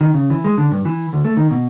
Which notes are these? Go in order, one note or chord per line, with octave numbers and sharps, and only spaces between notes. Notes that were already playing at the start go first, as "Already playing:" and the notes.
D#3
C#3
E3
G#3
D3
G2
E3
D2
A3
D#3
B2